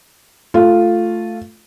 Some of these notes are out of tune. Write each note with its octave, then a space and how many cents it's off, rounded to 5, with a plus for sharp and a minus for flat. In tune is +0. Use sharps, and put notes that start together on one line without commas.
A3 +0 F4 +0